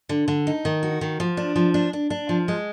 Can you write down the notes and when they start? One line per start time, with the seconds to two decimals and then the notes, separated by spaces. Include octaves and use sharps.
0.09 D3
0.28 D3
0.47 D#4
0.65 D#3
0.83 F#4
1.01 D#3
1.20 F3
1.37 D4
1.56 F3
1.74 D4
1.93 D4
2.10 D4
2.29 F3
2.48 G#3